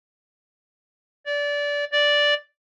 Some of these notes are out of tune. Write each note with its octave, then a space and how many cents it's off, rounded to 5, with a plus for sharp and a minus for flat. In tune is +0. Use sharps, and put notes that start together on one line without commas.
D5 -20
D5 -5